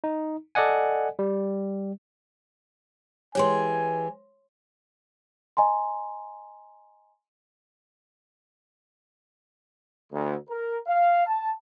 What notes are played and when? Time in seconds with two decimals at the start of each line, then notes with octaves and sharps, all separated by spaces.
0.04 D#4
0.55 A4 D5 D#5 F#5 G#5
1.19 G3
3.35 E3 G#3 G4 C#5 G#5 C6
5.57 D#5 G#5 A#5 C6
10.12 D2
10.48 A#4
10.87 F5
11.27 A5